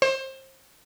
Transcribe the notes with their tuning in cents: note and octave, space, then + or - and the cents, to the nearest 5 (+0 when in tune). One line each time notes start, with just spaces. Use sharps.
C5 +25